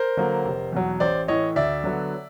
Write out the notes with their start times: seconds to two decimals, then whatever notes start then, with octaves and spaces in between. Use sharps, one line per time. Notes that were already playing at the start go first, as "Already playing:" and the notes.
Already playing: A#4 C5
0.17 D3 F#3 A#3
0.45 F1
0.73 E2 B2 F#3
1.00 A1 C5 D5
1.28 A2 E3 C#5 D#5
1.56 D2 D5 E5
1.84 D3 F#3 B3